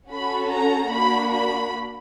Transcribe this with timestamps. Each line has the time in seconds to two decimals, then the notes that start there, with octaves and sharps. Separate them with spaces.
0.11 C#4 F#4 A4 B5
0.52 A#5
0.92 A#3 D4 F#4 B5
1.32 B5